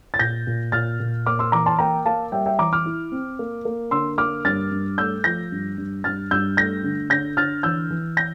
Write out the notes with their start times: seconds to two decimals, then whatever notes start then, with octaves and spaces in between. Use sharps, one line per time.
0.14 A6
0.19 A#2 G6 A#6
0.47 A#2
0.72 A#2 F6 A6
1.00 A#2
1.26 A#3 D6 F6
1.39 C6 E6
1.52 E3 A#5 D6
1.66 A5 C6
1.79 A#3 G5 A#5
2.05 A#3 F5 A5
2.32 G3 E5 G5
2.46 E5 G5
2.59 E3 A#5 D6
2.73 D6 F6
2.86 E4
3.12 C4
3.39 A#3
3.65 A#3
3.91 D3 C6 E6
4.18 A#3 D6 F6
4.45 G2 F6 A6
4.71 G2
4.98 A3 E6 G6
5.24 F3 G6 A#6
5.52 G2
5.78 G2
6.04 G2 F6 A6
6.31 G2 E6 G6
6.57 A3 G6 A#6
6.84 D3
7.10 D3 G6 A#6
7.37 D3 F6 A6
7.63 E3 E6 G6
7.90 E3
8.17 G6 A#6